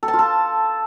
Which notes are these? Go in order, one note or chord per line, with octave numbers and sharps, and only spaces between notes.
A4
A5
F4
A4